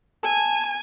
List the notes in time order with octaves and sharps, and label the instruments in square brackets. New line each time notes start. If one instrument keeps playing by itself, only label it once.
[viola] G#5 [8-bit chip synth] A5